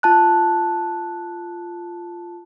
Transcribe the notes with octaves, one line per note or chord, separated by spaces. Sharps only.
F4 A5 F#6